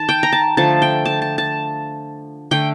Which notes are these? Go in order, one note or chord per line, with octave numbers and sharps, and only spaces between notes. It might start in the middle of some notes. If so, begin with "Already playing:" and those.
Already playing: D#3 A5
G5
A#5
A5
D3 F3 A3 A5
G5
A5
A5
A5
D3 A3 G5